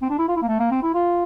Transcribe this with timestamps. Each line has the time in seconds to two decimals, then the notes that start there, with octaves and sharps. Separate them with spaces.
0.02 C4
0.10 D4
0.18 E4
0.28 F4
0.36 E4
0.42 A#3
0.48 A3
0.59 A#3
0.71 C4
0.83 E4
0.94 F4